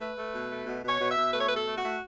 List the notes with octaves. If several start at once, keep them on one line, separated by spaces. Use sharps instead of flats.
A3 B4
A3
B2
A3
B2
B2 C#5
B2
E5
B2
A3 B4
C#5
B2 B4
A4
A3
F#4
A3